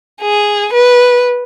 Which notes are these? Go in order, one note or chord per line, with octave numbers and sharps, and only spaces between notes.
G#4
B4